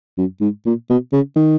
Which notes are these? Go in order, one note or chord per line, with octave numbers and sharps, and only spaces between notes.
F#2
G#2
A#2
B2
C#3
D#3